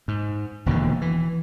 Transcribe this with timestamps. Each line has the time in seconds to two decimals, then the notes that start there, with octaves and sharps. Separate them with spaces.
0.08 G#2
0.66 E1 D#2 B2 D3
1.01 E3